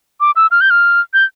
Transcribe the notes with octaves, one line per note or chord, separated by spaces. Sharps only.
D6
E6
F6
G6
F6
G6